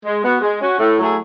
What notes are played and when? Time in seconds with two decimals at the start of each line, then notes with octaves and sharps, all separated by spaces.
0.04 G#3
0.24 B3 F#4
0.42 G#3
0.60 C#4 F#4
0.79 A2
0.98 F#3 A3 E4 G#4